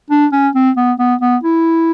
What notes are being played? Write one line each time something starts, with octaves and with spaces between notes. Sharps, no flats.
D4
C#4
C4
B3
B3
B3
E4